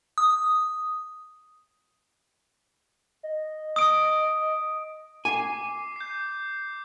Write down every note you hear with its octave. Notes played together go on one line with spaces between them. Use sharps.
D#6
D#5
D#6 D7
G#5 D6 C7
G6 C7